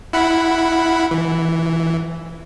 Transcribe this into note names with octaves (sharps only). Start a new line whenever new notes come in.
E4 F#5 B5
E3